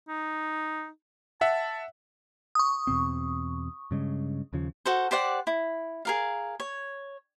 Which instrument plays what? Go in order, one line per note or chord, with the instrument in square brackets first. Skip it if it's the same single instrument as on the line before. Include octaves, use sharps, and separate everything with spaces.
[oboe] D#4
[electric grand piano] E5 F#5 [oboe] A5
[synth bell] C#6 D#6
[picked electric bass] E2 B2 C4
G2 C#3 G#3
D#2 C#3 F3
[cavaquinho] F#4 A4 C5
G4 C5 D5 F#5
E4
G#4 A#4 F5
C#5